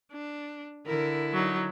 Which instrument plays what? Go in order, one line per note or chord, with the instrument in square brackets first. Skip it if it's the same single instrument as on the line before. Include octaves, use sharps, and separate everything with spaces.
[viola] D4
[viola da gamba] D3 E4 [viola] A#4
[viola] F#3 D#4